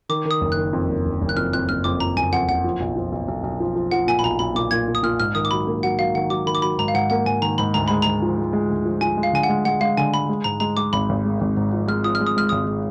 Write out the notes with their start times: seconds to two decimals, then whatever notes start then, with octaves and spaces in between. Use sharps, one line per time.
0.09 D#3 D6
0.25 D#3
0.31 D#6
0.41 F#1
0.52 D#3 F#6
0.73 F2
0.89 F#1
1.06 F#1
1.21 F#1
1.29 F#6
1.37 F2 F6
1.53 F2 F#6
1.69 F#1 F6
1.84 F2 D6
2.00 F2 A#5
2.16 F#1 G#5
2.32 F2 F#5
2.48 F#1 F#5
2.64 F3
2.80 B1
2.96 F3
3.12 B1
3.28 B1
3.43 B1
3.60 F3
3.76 F3
3.91 F3 F#5
4.07 A#2 G#5
4.19 B5
4.23 B1 A#5
4.39 B1 B5
4.55 A#2 D6
4.71 A#2 G#6
4.88 A#2
4.95 D#6
5.03 A#2 F6
5.20 G#2 F6
5.35 D#3 D#6
5.45 D6
5.51 F#3 B5
5.67 A#3
5.83 F#3 F#5
5.99 F#3 F5
6.15 D#3 F#5
6.30 F#3 D6
6.46 D#3 B5
6.55 D6
6.62 F#3 B5
6.78 G#2 A#5
6.88 F5
6.94 G#2 F#5
7.10 A#3 F#5
7.26 G#2 G#5
7.42 D#3 A#5
7.58 G#2 B5
7.74 D2 A#5
7.88 G#3 B5
8.02 G#3 A#5
8.22 F3
8.38 G#3
8.53 G#3
8.69 D2
8.85 F3
9.01 F3 G#5
9.17 G#3
9.23 F5
9.33 D3 G#5
9.43 F#5
9.49 G#3
9.65 G#3 F#5
9.81 G#3 F5
9.97 D3 G#5
10.13 G#3 B5
10.29 G#3
10.44 G#2 A#5
10.60 G#3 A#5
10.77 G#3 D6
10.93 G#1 B5
11.09 G#1
11.25 G#3
11.41 G#1
11.57 G#2
11.73 F3
11.88 G#3 F6
12.04 F3 D#6
12.15 F6
12.21 G#3
12.27 D#6
12.37 G#3 F6
12.49 G#1 D#6
12.67 G#3